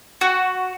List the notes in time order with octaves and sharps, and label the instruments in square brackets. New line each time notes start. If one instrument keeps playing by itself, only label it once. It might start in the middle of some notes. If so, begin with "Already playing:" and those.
[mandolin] F#4